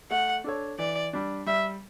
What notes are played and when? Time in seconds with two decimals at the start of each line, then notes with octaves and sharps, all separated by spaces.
0.11 A3 F#5
0.44 D4 A4 C#5
0.78 E3 D5
1.13 G3 D4
1.46 G3 E5